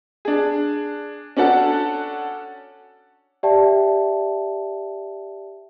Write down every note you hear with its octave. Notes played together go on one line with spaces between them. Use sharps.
D4 G#4
C#4 D4 F#4 A4 F#5 A5
G4 D5 E5 G5 A5